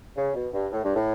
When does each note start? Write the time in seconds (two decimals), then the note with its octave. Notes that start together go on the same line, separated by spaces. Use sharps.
0.17 C#3
0.34 B2
0.53 G2
0.72 A2
0.84 G2
0.96 A2